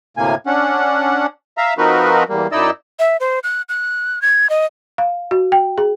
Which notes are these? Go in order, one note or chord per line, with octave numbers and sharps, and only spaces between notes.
D2 A2 C3 A#3 G#5
C#4 D4 F#5
E5 F5 A#5
F3 C4 D#4 F#4 A#4 B4
E2 G3 A#3
F#2 D#4 E4 D5 D#5 E6
E5
C5
F#6
F#6
G#6
D#5
F5
F#4
G5
G#4